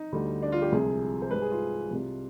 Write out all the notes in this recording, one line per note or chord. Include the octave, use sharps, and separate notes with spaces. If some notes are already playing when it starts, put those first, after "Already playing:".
Already playing: D#4
D2 D3 G3
D4
F4
G4
C2 C3 F3 G#3 G#4
C5
G#2 G3 B4
G#4
F4
C2 C3 G3